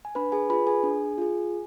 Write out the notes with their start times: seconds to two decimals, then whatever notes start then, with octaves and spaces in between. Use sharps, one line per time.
0.05 G#5
0.15 D4 B4 B5
0.32 G#4 G#5
0.50 F4 G#4 B4 B5
0.67 G#4 G#5
0.84 D4
1.18 F4 G#4